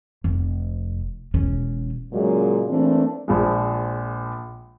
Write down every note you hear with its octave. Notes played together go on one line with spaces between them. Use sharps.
F1
E1 C#4
A#2 C#3 F#3 G#3
E3 A3 A#3 C4 D4
A#1 F3 G#3